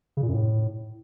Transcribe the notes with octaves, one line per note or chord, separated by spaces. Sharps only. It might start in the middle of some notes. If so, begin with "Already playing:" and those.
C#3
A#2
F#2
A2